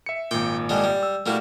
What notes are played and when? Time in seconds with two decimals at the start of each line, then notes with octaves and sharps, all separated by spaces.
0.06 E5 C#7
0.31 G#1 A#2 G5
0.69 D3 G3 G#3
0.84 G3
1.03 E6
1.26 G3 A3 A#3 E4 F#4 F6